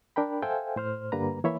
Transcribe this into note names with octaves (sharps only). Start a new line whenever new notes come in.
D4 A#4 G5 B5
A4 C5 E5 F5 G5 G#5
A2 C5 F6
G2 D3 G3 A#3 B4 A#5
E3 A#3 C#5 E5 B5